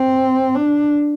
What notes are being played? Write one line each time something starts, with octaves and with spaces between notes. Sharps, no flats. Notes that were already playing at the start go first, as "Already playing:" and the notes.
Already playing: C4
D4